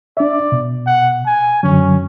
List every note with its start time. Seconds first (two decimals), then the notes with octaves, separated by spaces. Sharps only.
0.17 D4 D5 E5
0.52 B2
0.87 F#5
1.26 G#5
1.63 F#2 D3 F#3 C#4